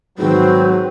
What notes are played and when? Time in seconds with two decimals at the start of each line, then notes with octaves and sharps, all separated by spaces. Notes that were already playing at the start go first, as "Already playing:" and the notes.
0.18 G#2 D#3 F#3 C4 F#4 B4